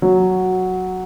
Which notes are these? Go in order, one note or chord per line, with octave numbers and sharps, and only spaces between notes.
F#3